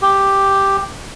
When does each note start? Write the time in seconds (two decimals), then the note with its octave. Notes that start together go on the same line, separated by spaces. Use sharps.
0.02 G4